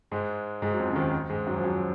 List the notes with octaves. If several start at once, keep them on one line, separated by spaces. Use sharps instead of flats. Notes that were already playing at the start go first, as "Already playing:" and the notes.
G#2 G#3
G#2 G#3
F#3
F2 F3
C#3
D#2 D#3
G#2 G#3
F#2 F#3
F3
F#2 F#3